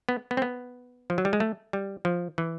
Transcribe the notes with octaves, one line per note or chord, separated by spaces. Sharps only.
B3
B3
C4
B3
F3
F#3
G3
G#3
A3
G3
F3
E3